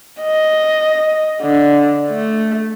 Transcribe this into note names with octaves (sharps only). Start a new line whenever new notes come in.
D#5
D3
A3